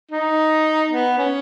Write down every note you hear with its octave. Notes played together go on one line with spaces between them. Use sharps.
D#4
B3
C#4